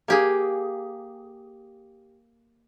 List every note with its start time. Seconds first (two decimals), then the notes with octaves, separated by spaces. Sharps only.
0.08 A#3 G4 G#4